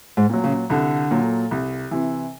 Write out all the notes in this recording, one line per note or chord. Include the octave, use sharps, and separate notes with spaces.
G#2
A#2 F#3
C#3
C2 D3
A#2 F#3
C2
C3 E3